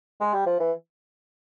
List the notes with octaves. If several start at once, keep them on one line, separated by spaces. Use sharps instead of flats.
G#3
G3
F3
E3